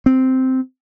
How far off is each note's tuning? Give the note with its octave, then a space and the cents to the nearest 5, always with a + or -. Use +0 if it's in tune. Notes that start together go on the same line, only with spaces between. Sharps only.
C4 -10